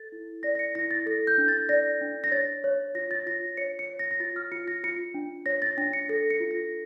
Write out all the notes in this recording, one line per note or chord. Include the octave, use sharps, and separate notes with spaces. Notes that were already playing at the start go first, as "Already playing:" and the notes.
Already playing: A4 A6
E4
D5 A#6
A#6
C#7
E4 A#6
A6
A4 A#6
G6
D4
A6
D5 A#6
D4
A#6
C#5 A6
C#5
F4 A#6
A6
F4 A#6
C#5 C#7
C#7
C#5
A#6
A#6
F4 A6
F6
F4 C#7
A#6
F4 C#7
D4
C#5 A#6
A6
D4 A#6
C#7
A4 A#6
C#7
F4
A#6